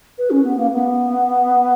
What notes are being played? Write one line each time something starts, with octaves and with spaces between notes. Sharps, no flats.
B4
C#4
B3
A#3
B3